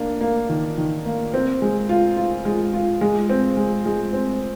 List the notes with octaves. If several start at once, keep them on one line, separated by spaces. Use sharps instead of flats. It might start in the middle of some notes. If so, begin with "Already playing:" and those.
Already playing: A#3 D4
A#3
D#3
D#3
A#3
C4
G#3
F4
F4
G#3
F4
G#3
C4
G#3
G#3
C4